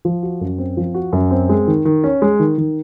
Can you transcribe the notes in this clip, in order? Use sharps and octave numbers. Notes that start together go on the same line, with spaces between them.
F3
F#4
F#2
C4
F3
F#4
F#2
C4
G#3
D#3
D#3
C#4
G#3
D#3
D#3